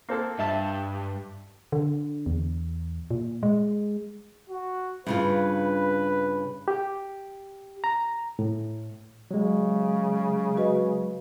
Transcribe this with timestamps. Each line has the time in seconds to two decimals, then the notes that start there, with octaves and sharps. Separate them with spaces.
0.09 A#3 C4 A4
0.39 G2 E5 A5
1.72 D3
2.26 E2
3.11 A#2
3.43 G#3
4.49 F#4
5.07 G2 C#3 F4 B4
6.68 G4
7.84 A#5
8.39 A2
9.31 C#3 F#3 G#3
10.57 F#4 B4 D#5